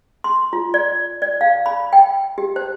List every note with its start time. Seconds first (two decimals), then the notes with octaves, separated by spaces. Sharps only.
0.24 C6
0.53 F4
0.74 D5
1.22 D5
1.41 F5
1.66 B5
1.93 G5
2.38 G4
2.56 C5